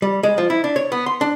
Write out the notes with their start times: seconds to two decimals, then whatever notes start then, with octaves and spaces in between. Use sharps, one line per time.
0.02 G3
0.23 G#3
0.38 F3
0.50 E4
0.64 D4
0.76 C#5
0.92 B3
1.06 C6
1.21 D4